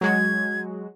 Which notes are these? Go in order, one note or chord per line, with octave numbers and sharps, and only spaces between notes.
F#3 G#3 F#4 G#6